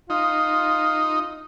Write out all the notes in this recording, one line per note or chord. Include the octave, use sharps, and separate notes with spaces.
D#4 F4